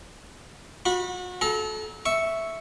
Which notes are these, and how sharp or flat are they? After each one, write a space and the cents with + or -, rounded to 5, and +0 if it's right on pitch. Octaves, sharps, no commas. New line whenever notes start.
F#4 -35 B5 -15
A4 -30 A#5 +20
E5 +0 C#6 +0